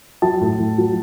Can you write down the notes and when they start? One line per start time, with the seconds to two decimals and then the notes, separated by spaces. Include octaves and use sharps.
0.22 F#3 A5
0.41 A2
0.59 A2
0.78 F#3